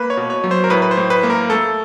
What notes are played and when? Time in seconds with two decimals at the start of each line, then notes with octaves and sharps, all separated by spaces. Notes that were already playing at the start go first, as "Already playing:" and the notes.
Already playing: A#3 B4
0.10 C#5
0.17 B2
0.30 C#5
0.44 F#3
0.51 C5
0.64 A#4
0.70 A2 B4
0.82 B4
0.91 C5
0.97 A2
1.10 B4
1.23 A#3
1.30 A#4
1.50 A3 A4